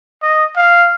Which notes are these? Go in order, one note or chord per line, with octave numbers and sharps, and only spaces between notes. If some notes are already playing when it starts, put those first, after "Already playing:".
D#5
F5